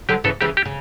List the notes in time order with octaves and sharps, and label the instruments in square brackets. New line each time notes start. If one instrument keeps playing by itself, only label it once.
[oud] D3 F#3 [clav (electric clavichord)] G4
[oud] C#3 E3 [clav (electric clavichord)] A4
[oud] C#3 E3 [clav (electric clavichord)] G4
[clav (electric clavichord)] G4
[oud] C#3